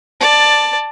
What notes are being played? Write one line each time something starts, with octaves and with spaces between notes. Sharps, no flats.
D5 A5